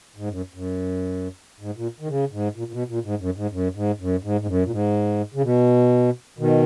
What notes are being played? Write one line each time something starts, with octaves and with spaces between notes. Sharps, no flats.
G#2
F#2
F#2
G#2
A#2
D#3
C#3
G#2
A#2
A#2
B2
A#2
G#2
F#2
G#2
F#2
G#2
F#2
G#2
G#2
F#2
A#2
G#2
C#3
B2
B2 D#3